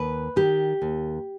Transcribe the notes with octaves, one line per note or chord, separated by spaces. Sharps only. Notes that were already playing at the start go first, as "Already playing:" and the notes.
Already playing: D#2 B4
D#3 G4
D#2